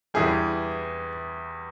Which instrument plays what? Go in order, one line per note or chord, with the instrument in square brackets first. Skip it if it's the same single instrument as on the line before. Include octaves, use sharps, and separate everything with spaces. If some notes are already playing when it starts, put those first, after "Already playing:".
[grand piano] E2 E3 G3 G#4